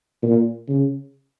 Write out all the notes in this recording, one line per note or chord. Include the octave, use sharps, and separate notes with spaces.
A#2
C#3